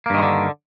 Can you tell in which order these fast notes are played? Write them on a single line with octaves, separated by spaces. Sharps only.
A#3 G2 D#3 G#3 D3